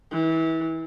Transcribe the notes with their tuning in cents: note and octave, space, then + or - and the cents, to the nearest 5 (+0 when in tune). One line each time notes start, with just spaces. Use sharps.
E3 -30